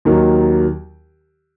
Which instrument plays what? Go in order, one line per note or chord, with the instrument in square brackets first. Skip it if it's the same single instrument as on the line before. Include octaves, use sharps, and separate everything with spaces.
[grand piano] D#2 D#3 F#3